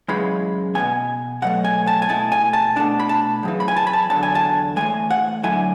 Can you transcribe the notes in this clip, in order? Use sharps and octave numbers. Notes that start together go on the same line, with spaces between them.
F#2 C#3 E3 G#3 B5
B2 F#3 B3 G#5
B2 F#3 A3 F#5
G#5
A5
G#5
B2 A3 E4 A5
G#5
A5
B2 A3 D4 A5
B5
A5
F#2 C#3 E3
B5
G#5
A5
B5
A5
E2 D3 F#3 A5
G#5
A5
A2 E3 G#3 G#5
F#5
D3 F#3 A3 E4 G#5